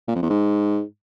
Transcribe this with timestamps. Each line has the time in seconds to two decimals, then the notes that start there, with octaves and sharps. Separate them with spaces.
0.08 A#2
0.15 F2
0.23 E2
0.30 G#2